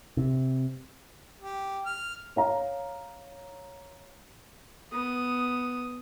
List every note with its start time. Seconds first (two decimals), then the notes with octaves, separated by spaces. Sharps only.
0.17 C3
1.41 G4
1.86 F6
2.36 C#5 F5 A#5
4.92 B3 D#6